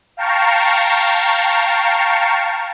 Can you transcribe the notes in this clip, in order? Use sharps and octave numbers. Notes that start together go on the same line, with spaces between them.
F5 G5 A5 A#5 C#6 C#7